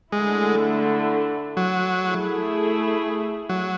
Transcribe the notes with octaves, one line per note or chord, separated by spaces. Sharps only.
D3 G#3 A3 E4
F#3
A3 E4 G#4
F#3